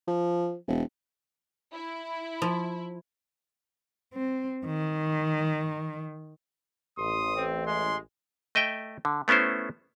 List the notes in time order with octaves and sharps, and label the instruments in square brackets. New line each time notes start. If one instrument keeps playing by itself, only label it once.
[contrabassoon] F3
E1
[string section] E4
[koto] F3
[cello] C4
D#3
[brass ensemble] A1 [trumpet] C6 [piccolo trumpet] D#6
[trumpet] C4
[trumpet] G#3 [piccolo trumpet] C6
[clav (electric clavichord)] A3 D#5 E5 G5
D3
A3 B3 C#4 E4 C5